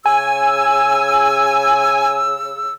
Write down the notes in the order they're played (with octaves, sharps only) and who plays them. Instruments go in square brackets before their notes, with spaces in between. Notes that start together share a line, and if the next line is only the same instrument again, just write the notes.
[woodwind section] C#3 E6 [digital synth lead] G#5